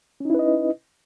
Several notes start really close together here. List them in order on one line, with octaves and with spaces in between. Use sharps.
C#4 D#4 E4 B4 D#5